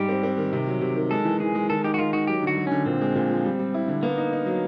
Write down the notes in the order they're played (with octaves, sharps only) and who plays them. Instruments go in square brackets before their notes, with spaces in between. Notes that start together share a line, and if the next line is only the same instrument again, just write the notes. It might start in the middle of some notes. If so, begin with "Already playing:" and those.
Already playing: [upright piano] G#2 G3 [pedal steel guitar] G4
[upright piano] C4
C4
D#3
C3
F#3
C3
D#3
[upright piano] G#3 [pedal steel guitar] A4
[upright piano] E3
[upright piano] E3 [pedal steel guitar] G#4
[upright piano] G#3
[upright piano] D#3 [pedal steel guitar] A4
[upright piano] D#4 [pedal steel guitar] G4
[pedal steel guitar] F#4
[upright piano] D#3 [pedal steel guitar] F4
[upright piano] D#4 [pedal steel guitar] F#4
[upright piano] F#3 [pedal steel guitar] G4
[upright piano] D3 [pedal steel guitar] F#4
[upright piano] F#3
[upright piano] D3 [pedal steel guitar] C#4
[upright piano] A#2 [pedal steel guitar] C4
[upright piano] G#3
A#2
F3
G3
G3
E4
D3
[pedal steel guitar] A#3 [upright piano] B3
[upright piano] D#4
D#4
F#3